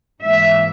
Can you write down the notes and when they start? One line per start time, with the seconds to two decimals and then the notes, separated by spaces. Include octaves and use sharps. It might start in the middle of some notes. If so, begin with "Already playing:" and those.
0.23 G#2 E3 A#3 E5